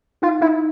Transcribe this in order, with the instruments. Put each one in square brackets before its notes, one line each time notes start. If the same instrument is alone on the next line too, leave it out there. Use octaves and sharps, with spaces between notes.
[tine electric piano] D#4 [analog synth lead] F4
[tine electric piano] D#4 [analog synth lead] E4